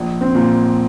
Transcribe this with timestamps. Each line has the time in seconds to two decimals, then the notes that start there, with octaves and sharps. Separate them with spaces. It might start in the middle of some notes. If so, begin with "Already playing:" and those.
Already playing: A#1
0.21 C4
0.35 A#2